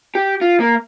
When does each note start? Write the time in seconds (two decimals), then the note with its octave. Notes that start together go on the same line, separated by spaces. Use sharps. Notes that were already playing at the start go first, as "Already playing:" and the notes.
0.15 G4
0.41 F4
0.60 A#3